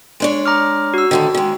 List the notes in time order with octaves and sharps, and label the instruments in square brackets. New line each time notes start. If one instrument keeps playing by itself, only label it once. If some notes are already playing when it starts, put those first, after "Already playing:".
[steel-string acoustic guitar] G#3 D4 C#5
[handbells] A#5 D6 F6
F#4 E6
[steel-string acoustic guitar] A2 D3 D#3
D#3 G#3